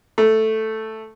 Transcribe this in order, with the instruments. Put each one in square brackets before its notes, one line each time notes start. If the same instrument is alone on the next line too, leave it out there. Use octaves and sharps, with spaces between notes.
[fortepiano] A3